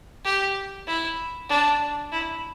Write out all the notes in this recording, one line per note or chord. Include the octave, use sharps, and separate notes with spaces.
G4
E4
D4
E4